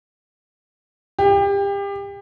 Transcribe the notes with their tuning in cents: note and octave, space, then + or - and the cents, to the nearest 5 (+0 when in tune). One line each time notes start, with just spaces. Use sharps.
G4 +30